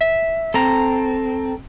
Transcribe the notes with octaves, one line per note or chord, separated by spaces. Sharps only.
E5
C4 A4 A#5